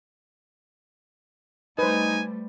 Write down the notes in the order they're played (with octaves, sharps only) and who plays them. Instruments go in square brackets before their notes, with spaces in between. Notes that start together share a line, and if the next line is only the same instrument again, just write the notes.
[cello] G3 A3 [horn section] D#4 [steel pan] B4 C5 [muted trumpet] G#5